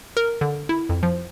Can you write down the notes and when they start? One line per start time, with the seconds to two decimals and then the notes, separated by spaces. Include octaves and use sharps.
0.17 A#4
0.41 D3
0.69 E4
0.89 F2
1.03 F3